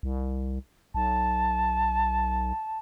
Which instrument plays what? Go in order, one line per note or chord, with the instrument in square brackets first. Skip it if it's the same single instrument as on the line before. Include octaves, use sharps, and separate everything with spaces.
[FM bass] C2
[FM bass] B1 [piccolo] A5